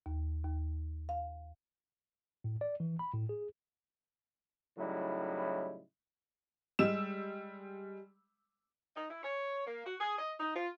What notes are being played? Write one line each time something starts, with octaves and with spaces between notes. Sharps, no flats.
D#2
D#2
F5
A2
D5
E3
B5
A2
G#4
A2 C#3 F#3 G3 D#4 E4
G3 G#3 E6 E7
D#4
E4
C#5
A#3
F#4
G#4
D#5
D#4
F4